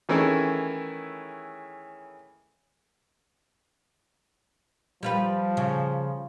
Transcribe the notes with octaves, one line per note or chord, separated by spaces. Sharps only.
D#3 E3 A3 C#4 E4 G#4
F3 G3 F4 B4
C#3